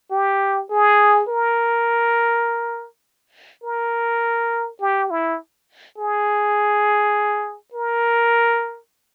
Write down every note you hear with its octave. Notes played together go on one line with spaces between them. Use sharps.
G4
G#4
A#4
A#4
G4
E4
G#4
A#4